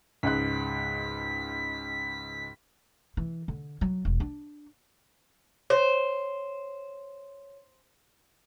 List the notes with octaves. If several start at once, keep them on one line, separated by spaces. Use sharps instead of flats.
C#2 G#2 F#6 B6
E3
D3
F#3
E1
D4
C5 C#5